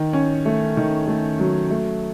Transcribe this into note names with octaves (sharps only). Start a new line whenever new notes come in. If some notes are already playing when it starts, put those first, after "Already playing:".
Already playing: D#3
C#4
A3
D#3
A3
F#3
A3